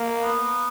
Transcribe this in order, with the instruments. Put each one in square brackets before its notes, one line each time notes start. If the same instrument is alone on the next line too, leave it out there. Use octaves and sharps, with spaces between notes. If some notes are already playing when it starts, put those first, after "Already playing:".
Already playing: [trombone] A#3
[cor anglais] B3